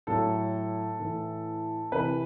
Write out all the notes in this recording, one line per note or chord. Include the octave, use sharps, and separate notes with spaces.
A2 F#3 A4
A2 E3
C3 E3 B4